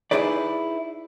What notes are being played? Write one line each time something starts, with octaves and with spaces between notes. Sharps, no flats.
D#4 E4 F#4 G#4 B4 D5